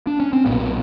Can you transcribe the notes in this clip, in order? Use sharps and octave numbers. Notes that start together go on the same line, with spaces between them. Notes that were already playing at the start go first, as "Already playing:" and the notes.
D4
C#4
C4
B1 A#2 B3